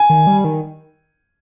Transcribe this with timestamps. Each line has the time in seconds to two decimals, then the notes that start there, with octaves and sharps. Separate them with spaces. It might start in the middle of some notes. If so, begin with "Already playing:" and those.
Already playing: G#5
0.10 D#3
0.27 G3
0.44 D#3